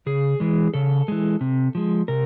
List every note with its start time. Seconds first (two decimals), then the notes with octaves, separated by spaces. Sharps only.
0.06 C#3 G#4
0.40 E3 G#3
0.74 C#3 A4
1.08 E3 G#3
1.41 C3
1.75 F3 G#3
2.08 C3 A#4